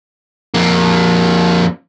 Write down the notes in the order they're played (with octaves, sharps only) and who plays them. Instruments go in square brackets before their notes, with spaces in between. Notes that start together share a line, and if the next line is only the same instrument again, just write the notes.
[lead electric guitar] F2 A#3